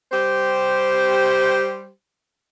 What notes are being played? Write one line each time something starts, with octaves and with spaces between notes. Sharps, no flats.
G3 G4 C5